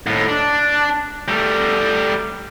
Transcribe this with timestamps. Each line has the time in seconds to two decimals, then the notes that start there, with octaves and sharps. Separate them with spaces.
0.07 D#2 A2
0.28 D4
1.28 G3 A3